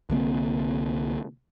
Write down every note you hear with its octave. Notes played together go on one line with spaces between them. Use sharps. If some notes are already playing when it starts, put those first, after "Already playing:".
C2 D3 A#3 C4